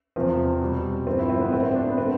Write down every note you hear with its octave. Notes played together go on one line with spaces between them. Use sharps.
E2 C3 F3 C4
B2 G3
G2 D3 F3 C4
E4
C4
B3
A2 F3 C4
C4
D4
B3
D3 G3 C4